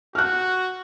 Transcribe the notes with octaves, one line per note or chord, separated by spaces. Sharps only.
F#4 F6 F#6